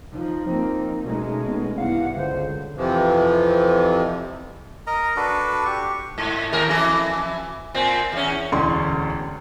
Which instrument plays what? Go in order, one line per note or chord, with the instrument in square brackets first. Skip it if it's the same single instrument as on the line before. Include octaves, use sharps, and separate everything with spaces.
[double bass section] F3 [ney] D#4
[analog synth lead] F3 [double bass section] A#3 C4
[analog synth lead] B2 [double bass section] G#3 C#4 [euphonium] A3
[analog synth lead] B3
[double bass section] C2 G2 [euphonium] E4 [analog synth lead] F5 [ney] F#5
[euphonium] C#2 [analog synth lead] D3 [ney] C5
[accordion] F2 C3 E3 F3
[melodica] A#4 D#5 A#5
D4 F#4 A4 B4
G4 C#6
[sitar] G#2
D#2 A2 A#4
F2 E3 A4
A#2 C4
E2 C#4
[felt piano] E1 A1 D2 C#4 C6 C#6